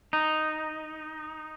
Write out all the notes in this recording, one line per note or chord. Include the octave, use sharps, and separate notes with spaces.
D#4